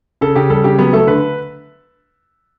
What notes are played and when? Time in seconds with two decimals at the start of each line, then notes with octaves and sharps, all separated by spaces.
0.21 C#3 A4
0.35 C#3 G4
0.50 G3 A4
0.64 C#3 G4
0.79 F#3 B3
0.93 A3 A4
1.07 D3 B4